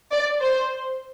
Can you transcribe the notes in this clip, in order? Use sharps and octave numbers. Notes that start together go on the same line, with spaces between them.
D5
C5